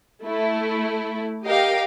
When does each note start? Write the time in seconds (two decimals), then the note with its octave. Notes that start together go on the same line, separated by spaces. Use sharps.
0.23 A3 E4
1.44 G4 A#4 D#5 F5 G5